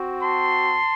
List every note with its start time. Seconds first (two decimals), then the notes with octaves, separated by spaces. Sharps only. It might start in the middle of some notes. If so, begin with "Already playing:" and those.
Already playing: C4 F#4
0.22 A5 C6